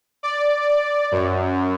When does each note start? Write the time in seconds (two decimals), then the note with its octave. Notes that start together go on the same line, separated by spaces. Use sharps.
0.23 D5
1.12 F#2